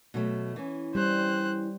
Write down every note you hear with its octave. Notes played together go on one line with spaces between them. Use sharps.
B2 F#3 A3
E3 C#4
G3 C5 F#6